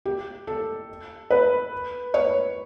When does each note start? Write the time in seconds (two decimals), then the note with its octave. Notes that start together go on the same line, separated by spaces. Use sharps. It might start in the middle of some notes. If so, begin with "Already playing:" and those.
0.05 G4
0.47 A4
1.30 B4
2.14 C#5